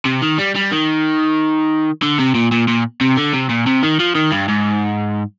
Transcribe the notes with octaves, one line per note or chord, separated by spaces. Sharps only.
C3
D#3
G3
G3
D#3
D3
C3
A#2
A#2
A#2
C3
D3
C3
A#2
C3
D#3
F3
D#3
G2
G#2